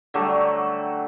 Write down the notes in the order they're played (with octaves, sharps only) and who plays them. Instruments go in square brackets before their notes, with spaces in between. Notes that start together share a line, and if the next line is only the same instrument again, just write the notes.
[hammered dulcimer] D3 F#3 G3 A3